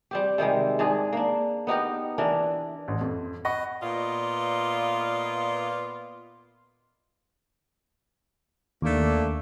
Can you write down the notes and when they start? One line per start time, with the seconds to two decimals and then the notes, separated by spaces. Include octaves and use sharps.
0.11 G3 C4 G4
0.38 C3 D#3 G3 G#3
0.79 G#2 D4 G#4
1.13 A#3 D4
1.67 B3 D#4 G4 A#4
2.18 E3 D4 A#4
2.88 A1
3.01 F2
3.45 D#5 F#5 B5 C#6
3.81 A#2 B3 F4 D5 D#5
8.82 D#2 A3 A#3 D4